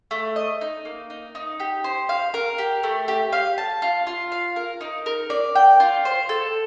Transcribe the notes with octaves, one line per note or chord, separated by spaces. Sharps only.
A3
D#5
D#4
A#3
D#4
D#4
G4
C5
F5
A#4
G4
A3
G4
F5
A5
F4
F4
F5
A#4
D#4
A#4
D5
G5
F4
C5
A4